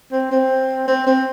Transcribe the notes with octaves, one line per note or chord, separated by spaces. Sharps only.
C4
C4
C4
C4